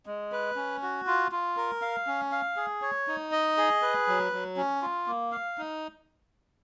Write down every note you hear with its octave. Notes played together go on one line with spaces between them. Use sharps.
G#3
B4
C#4
F#4
F4
F4
A#4
F5
C#4
F5
G#4
C#5
D#4
D#5
G#4
B4
F#3
F#3
C#4
F4
A#3
F5
D#4